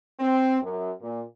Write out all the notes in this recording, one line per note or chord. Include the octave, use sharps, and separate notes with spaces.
C4
F#2
A#2